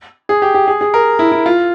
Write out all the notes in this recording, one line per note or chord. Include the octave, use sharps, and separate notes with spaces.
G#4
G4
G4
G#4
G#4
A#4
E4
E4
F4